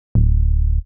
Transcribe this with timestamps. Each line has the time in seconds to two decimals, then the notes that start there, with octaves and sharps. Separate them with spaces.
0.15 D1